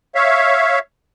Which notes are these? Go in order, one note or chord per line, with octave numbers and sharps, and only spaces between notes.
C#5 E5 F5